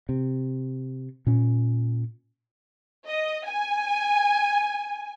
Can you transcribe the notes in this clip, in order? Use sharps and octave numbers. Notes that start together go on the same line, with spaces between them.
C3
A#2 C#4
D#5
G#5